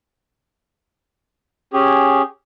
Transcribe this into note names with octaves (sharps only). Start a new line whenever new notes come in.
C#4 G4 G#4